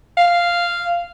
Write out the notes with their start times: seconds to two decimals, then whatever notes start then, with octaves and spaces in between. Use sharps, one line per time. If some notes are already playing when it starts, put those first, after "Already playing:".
0.17 F5